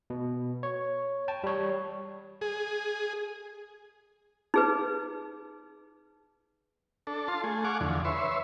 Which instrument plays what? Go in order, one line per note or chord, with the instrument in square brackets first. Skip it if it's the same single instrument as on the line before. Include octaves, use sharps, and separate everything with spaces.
[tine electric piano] B2
C#5
G5 A5
G3 C#5
[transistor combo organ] G#4
[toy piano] D#4 G#4 B4
[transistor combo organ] D4 A4
F4 A5 C6
A3 G#4
F5 F#5 G#5 C#6 D6
E2 D3 F3
B4 C#5 E5 C6